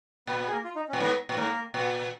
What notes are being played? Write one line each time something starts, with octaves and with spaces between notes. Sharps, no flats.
A#2 B3 B4
B3 B4
G#4
A#3 A#4
F4
D#4
C#4
A#2
G#2 B3 B4
A#2
G#2 A#3 A#4
A#2